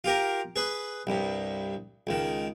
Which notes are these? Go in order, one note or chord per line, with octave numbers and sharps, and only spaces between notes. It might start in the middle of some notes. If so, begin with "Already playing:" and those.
F4 G4 A#4
G#4 B4
C2 G2
C#2 D#3